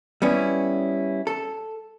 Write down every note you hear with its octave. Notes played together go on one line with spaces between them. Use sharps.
G3 B3 C#4 E4
A4